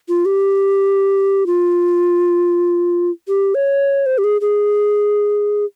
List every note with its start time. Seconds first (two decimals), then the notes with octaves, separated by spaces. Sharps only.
0.09 F4
0.25 G4
1.47 F4
3.28 G4
3.55 C#5
4.06 C5
4.18 G4
4.24 G#4
4.41 G#4